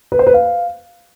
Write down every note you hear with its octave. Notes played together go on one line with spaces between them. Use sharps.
B4
C5
B4
F5